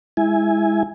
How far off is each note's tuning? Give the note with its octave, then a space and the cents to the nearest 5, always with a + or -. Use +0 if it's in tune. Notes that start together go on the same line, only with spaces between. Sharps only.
G#3 -10 E4 -5 G#5 +0